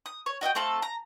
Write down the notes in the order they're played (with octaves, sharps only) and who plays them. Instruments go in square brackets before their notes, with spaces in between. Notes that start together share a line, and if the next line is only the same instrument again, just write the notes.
[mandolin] D#6
C#5
F#4 D#5 E5 G5
A3 C4 F4 A4
A#5